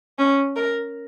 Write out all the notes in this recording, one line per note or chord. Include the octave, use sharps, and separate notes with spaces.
C#4
A#4